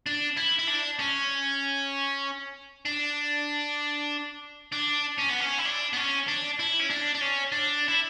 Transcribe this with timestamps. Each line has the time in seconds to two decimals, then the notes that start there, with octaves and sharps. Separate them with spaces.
0.06 D4
0.37 E4
0.59 E4
0.68 D4
0.99 C#4
2.86 D4
4.73 D4
5.19 C#4
5.30 B3
5.41 C#4
5.58 E4
5.66 D4
5.93 B3
5.97 C#4
6.28 D4
6.59 E4
6.79 C#4
6.90 D4
7.15 D4
7.21 C#4
7.52 D4
7.88 E4